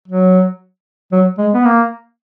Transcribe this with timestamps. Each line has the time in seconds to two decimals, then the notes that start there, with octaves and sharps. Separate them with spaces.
0.08 F#3
1.12 F#3
1.38 G#3
1.54 B3
1.65 A#3